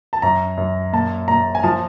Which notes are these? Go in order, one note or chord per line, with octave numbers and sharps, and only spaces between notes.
A5
F#2 A#5
F#2
A#2 A5
A#2 A#5
G#5
F3 A5